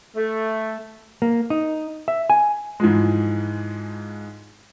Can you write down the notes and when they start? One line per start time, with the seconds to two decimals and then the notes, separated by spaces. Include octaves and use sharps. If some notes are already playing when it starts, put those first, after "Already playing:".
0.16 A3
1.22 A#3
1.50 D#4
2.08 E5
2.30 G#5
2.80 G#2 E3 F3 G#3